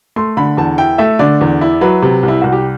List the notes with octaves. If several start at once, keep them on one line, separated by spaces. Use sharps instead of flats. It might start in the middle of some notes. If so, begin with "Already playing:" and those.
A3 C6
D3 B5
E2 A5
E4 G5
A3 E5
D3 D5
E2
E4
F#3 B4
C3
C2
E4
C2 F#4
G4